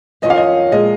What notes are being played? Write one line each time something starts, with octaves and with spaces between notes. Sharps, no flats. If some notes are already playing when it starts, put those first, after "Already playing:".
F2 D#3 F#3 C#4 F4 D#5
F5
D#5
A#2 F3 G#3 D#5